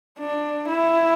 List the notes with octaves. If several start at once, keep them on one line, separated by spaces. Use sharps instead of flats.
D4
E4